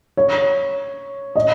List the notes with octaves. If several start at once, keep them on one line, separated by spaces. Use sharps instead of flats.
C#5
D#5